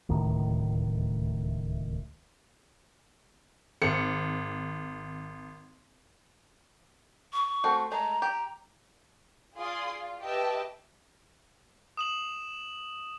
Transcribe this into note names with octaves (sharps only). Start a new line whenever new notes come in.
D1 C#2 A2 D#3
G#1 C#7
C#6
A3 C4 F#4
G#3 A3 A#5
G4
F4 G#4 D5 F5 C6 D#6
F4
G4 B4 D#5 E5 G5 A5
D#6 E7 F#7